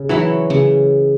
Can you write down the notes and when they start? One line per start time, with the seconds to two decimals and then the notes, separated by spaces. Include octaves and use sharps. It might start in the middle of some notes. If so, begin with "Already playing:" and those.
Already playing: C#3
0.09 E3 F#3 E4 C#5
0.50 C#3